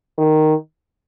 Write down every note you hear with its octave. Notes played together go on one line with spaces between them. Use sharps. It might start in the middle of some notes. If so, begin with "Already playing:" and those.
D#3